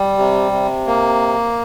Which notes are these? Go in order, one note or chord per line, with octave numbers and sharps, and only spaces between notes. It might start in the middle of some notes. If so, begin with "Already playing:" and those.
Already playing: G3
C3
C3
A#3